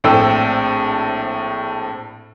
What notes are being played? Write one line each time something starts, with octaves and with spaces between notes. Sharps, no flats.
A#1 A2 C4 A4 G5 E6